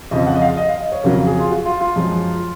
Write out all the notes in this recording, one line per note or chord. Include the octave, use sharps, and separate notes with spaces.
F2 C#3 F3 D#5
F#5
D#5
F5
D#5
F5
D#5
C#5
F2 C#3 F#3 A#4
G#4
F4
F#4
F4
F4
F#2 F3 G#3